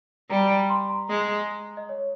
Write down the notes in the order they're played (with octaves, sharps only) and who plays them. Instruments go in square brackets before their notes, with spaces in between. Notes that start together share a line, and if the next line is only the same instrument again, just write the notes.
[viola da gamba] G3 [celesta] A#5
[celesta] A#5
C6
A#5
[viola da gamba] G#3
[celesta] D#5
C#5